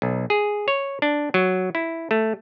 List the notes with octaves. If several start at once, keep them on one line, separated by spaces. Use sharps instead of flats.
B1
G#4
C#5
D4
F#3
E4
A3